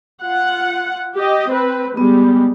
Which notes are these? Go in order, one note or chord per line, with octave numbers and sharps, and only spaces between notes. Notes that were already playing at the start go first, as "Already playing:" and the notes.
F4 F#5
G4 D#5
C4 B4
G3 G#3 B3